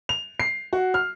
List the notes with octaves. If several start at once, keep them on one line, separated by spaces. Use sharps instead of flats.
F7
C7
F#4
F6